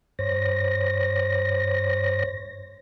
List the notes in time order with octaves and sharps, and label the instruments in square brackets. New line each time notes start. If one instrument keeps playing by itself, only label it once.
[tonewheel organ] G2 C5 C#5 A#6